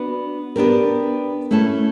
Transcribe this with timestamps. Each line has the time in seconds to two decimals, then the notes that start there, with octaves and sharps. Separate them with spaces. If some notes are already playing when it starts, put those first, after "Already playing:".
Already playing: B3 D4 F#4 B4
0.56 B3 D4 G4 A#4
1.51 A3 C#4 E4 A4